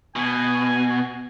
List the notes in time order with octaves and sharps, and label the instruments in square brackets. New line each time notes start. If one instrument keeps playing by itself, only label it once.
[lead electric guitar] B2 [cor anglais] G#5